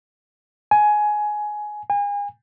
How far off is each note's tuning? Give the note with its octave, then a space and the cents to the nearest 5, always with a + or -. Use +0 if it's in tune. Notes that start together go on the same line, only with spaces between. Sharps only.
G#5 +15
G#5 -35